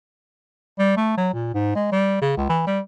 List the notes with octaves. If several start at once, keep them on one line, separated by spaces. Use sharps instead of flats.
G3
A3
F#3
A#2
G#2
G#3
G3
C#3
C#2
E3
G3